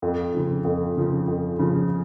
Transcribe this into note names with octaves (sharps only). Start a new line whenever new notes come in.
F2
C#3 F3
F2
C#3 F3
F2
C#3 F3